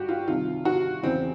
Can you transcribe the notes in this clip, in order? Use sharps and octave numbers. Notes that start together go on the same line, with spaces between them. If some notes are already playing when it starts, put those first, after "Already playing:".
Already playing: G2 F#4 G4
F4
C2 C3 D#3 F4
F#4
E2 C#3 E3 C4